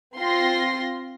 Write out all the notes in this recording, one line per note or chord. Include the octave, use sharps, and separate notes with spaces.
C4 F4 C6 A#6